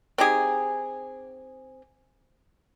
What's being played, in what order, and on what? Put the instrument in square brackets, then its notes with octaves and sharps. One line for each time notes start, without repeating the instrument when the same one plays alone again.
[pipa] C4 D#4 G4 G#4